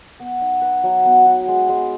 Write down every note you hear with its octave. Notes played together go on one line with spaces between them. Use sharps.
B3
D#4
B4
F#3
B3
F#4
G#3
G#3